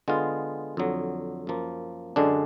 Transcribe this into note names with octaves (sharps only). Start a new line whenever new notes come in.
D3 G#3 B3 F4
F2 D3 F#3
F#2 F3 A#3
F#2 D3 G#3 D4